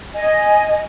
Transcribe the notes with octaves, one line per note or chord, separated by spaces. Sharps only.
D#5 G#5